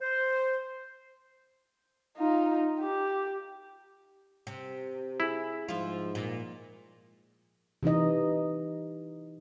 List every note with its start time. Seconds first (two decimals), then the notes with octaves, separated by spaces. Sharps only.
0.01 C5
2.17 D#4 F4
2.80 G4
4.47 C3
5.20 E4 G#4
5.68 G#2 F3 F4
6.15 A#2
7.83 C3 E3 D#4 D#5